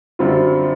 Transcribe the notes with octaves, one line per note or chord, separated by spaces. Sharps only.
F#2 D3 G3 C4 F4